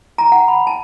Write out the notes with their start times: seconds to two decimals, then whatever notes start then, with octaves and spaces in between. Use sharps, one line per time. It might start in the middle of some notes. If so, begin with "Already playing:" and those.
0.18 A#5
0.32 F#5
0.48 B5
0.67 A5